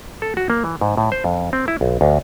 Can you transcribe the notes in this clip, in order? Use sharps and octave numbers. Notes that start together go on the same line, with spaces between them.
A4
F#4
A#3
E3
G#2
A2
C5
F2
C4
E4
B1
D2